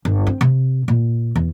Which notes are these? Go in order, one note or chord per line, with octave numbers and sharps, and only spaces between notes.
G1
C4
C3
A#2
E2